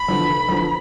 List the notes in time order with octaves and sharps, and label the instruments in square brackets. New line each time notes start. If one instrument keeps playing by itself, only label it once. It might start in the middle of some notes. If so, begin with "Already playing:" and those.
Already playing: [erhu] B5
[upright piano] E2 D3 F3
F1
E2 D3 F3